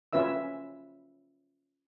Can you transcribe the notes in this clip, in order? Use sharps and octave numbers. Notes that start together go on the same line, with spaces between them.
C#4 F4 B4 E5 E6